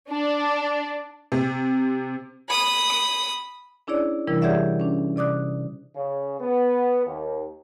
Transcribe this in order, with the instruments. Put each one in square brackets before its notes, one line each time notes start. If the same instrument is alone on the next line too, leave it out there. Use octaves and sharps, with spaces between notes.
[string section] D4
[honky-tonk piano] C3
[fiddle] B5 D#6
[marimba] C#4 D4 E4 G#4 C#5 D5
C3 E3 G3 D4 E4 A#4
G4 G#4 C#5 D5 E5 F#5
C#4 D4
C3 D5 D6 D#6 F#6
[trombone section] C#3
B3
D#2